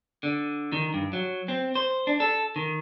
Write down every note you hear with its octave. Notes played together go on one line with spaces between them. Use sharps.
D3
D#3
G2
F#3
C4
C5
D4
A4
D#3